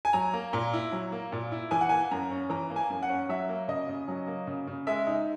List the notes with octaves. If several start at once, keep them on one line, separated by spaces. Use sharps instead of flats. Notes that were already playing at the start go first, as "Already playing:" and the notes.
G#5
F#3 A#5
A#3
A#2 A#5
E4
F#3
A#3
A#2
E4
E3 G#5
F#5
A#3 G#5
F#2 A#5
C#4
E3 A#5
A#3
G#5
F#2
F#5
C#4
F#3 E5
A#3
C#3 D#5
C#3
F#3
A#3
C#3
C#3
G#3 E5
D#4